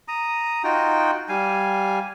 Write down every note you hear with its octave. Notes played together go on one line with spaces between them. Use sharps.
A#5 D#6
D#4 F4 F#4 G5
G3 F5 G#5